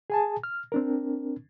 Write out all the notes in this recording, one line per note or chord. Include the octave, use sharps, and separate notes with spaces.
G#4 G#5 A5
F6
C4 D4 A#4